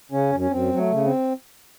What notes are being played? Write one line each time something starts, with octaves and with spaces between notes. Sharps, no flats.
C#3 C#4
F#2
C#4
F#2 C4
F#3
A3
C#3
C4